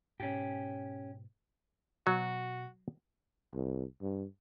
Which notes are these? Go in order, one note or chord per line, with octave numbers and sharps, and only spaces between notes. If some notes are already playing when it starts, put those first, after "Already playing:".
G#2 B2 C#4 G4
B2 F#3 F#4
C2
G2